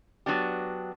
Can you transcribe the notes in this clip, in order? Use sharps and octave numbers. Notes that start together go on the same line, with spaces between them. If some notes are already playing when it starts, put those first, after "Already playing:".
F#3 B3 D4 G4